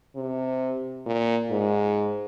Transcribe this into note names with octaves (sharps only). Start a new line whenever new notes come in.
C3
A#2
G#2